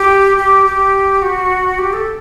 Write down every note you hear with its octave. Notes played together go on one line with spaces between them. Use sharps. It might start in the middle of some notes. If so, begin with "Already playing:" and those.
Already playing: G4
G4
G4
F#4
G4
A4